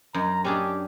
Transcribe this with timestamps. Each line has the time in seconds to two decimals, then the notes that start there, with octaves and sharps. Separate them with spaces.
0.14 F#2 A#5
0.45 C#4 D4 G4 G#4